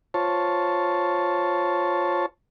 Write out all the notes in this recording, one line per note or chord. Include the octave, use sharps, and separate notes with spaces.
F4 C5 C#5 A5